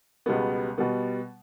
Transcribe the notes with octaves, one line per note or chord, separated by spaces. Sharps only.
C#2 B2 G3 B3
B2 G3 B3